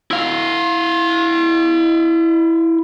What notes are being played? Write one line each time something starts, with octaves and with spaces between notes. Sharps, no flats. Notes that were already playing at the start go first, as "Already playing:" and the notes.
E4 F5